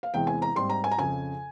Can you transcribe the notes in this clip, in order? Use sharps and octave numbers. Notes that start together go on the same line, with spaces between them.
F5
E2 C3 E3 G#3 C4 G5
G#5
A#5
G#2 G3 C4 C6
A#5
G#5
A#5
F2 C#3 F3 G#5